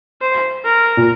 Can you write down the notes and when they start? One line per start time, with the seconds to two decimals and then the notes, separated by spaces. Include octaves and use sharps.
0.21 C5
0.65 A#4
0.97 A#2